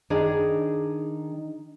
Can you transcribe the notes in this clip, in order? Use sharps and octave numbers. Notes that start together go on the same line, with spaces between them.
D#3 D4 D#4 G#4